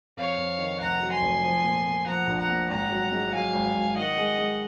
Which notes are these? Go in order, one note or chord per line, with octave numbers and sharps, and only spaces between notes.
F2 C#5 F5
F2
D#3
F1 F#5 A#5
F#3
G#5 C6
F1
F3
A#2
A#2
F3 F#5 A#5
A#1
F#5 A#5
A#2
G#1 F#5 A#5
F#3
G#2
F#3 F5 G#5
G#1
G#1
D#3 D#5 F#5
G#3
G#3